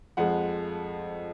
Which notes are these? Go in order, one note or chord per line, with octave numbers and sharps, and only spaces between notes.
F2 F3 G#3 F#5